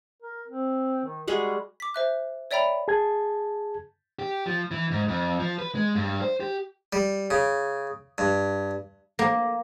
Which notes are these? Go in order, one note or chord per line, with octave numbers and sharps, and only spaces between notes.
A#4
C4
D#3
G3 G#3 F#4 G#4
D6 B6
C5 E5 F#6
C#5 D5 E5 G5 A#5 B5
G#4 A5 G#6
G4
F3
E3
G#2
F2
F3
B4
G#3
G2
C5
G4
G3
C#3
G2
A#3